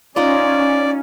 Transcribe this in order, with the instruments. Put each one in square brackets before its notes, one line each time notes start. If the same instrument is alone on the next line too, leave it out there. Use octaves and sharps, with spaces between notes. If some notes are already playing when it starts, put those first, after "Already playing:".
[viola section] C#4 [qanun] D#4 F4 D#5 [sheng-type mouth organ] D5